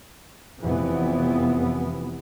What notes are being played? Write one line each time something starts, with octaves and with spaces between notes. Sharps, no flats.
F1 E3 B3